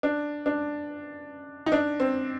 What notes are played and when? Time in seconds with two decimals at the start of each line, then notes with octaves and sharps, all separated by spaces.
0.03 D4
0.46 D4
1.66 D#4
1.72 D4
2.00 C4